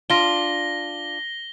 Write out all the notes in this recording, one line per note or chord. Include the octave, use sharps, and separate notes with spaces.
D4 F4 A#6 G7